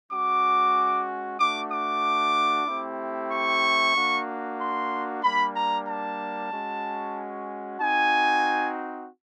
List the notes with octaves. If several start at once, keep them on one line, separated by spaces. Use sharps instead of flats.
G#3 C#4 F#4 D6
A3 D4 F#4 D6
D6
A3 C4 E4 G4
C#6
A#3 D4 F#4
C6
G3 A#3 D4 B5
A#5
A5
G#3 C#4 F#4
C4 D#4 F#4 G#5